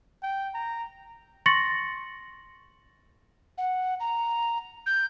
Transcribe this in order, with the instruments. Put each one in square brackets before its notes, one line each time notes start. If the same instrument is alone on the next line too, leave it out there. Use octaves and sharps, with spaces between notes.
[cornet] G5
A#5
[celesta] C6 C#6 A6 A#6 C#7 F#7
[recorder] F#5
A#5
G6